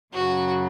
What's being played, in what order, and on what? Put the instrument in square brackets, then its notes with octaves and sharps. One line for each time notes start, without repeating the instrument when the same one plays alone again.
[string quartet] F#2 C#3 F#3 [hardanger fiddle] F#4